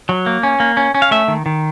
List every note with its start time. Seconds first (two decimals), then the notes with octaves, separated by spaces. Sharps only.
0.09 F#3
0.26 A#3
0.43 C#4
0.60 A#3
0.77 C#4
0.95 C#4
1.02 F5
1.11 A3 E5
1.28 D#3
1.46 D#3